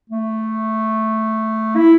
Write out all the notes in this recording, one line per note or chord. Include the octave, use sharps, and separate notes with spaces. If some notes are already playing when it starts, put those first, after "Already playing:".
A3
E4